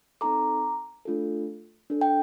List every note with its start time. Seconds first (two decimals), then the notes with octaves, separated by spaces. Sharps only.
0.21 C4 D#4 A4 A#5 D6
1.05 A3 D4 F4 A4
1.90 D4 A4
2.01 G5